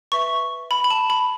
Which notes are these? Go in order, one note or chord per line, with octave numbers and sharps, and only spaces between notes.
B4 E5 C#6
B5
B5
A5
B5